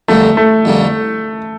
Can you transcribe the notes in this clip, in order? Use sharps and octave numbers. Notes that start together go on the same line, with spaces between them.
F2 D3 G3 A3 A#3
A3
F2 D3 G3 A#3